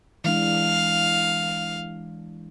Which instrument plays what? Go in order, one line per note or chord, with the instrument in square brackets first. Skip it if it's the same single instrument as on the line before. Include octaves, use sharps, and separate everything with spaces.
[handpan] E3 G#3 D4 [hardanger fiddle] F5